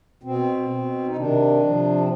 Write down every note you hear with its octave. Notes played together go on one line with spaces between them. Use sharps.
B2 C4
B2
D#4
C3 D#3 D4
C3 F3
C4